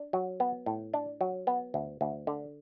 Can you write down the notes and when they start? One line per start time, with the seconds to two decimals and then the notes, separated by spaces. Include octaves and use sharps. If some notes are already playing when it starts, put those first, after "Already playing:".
Already playing: D4
0.13 F#3
0.40 B3
0.66 A2
0.94 D4
1.21 F#3
1.47 B3
1.74 D2
2.01 D2
2.27 D3